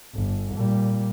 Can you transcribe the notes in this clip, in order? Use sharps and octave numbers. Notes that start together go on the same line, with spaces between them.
G1
A#2 G3